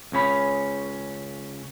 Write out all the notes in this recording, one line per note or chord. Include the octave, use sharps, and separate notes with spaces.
C#2 C#3 C#4 B5